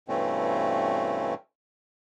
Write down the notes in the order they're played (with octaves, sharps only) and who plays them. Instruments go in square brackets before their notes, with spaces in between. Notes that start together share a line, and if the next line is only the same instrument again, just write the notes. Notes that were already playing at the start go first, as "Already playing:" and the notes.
[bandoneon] G2 B2 E3 A3 C4 C#4